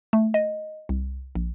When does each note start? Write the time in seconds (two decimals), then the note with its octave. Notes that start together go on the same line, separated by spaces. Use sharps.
0.13 A3
0.34 D#5
0.89 C2
1.35 A#1